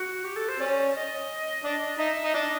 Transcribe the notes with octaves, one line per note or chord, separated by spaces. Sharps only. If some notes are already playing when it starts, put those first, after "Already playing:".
Already playing: F#4
G4
A4
C5
C#4 D5
D#5
D4
D#4 E5
D#4
D4 D#5